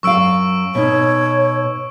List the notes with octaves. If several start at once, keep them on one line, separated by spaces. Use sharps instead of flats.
F#2 F5 C#6 E6 D7
B2 D#4 C#5